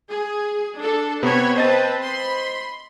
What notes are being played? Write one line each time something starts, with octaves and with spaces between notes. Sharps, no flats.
G#4
D4 A4
C3 B3 C#5 B5
C4 B4 C5 D#5 A5 A6
B5 C6